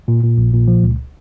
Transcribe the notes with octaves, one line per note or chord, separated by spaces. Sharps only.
A#2
A#2
A#1
A#2
F3
C#2